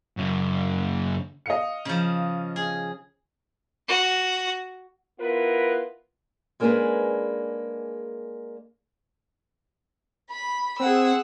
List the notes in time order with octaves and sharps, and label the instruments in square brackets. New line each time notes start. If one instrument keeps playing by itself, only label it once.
[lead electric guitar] F#2 C#3
[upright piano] D#5 F5 C#7
[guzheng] C#3 F3
G#4
[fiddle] F#4
[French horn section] B3 E4 F4 A#4 B4
[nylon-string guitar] G#3 A#3 C#4 D4 G#4 B4
[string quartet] B5
[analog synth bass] C4 [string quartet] G#4 F#5 E6